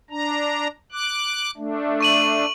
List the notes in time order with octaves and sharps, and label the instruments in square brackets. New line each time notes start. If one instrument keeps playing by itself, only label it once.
[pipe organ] D4 A#5
D6 F#6
A3 D4
[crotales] C#6 D#7 F#7